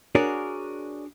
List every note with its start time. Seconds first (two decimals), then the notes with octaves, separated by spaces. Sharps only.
0.15 D4 F#4 G#4 A#4 C#5 D5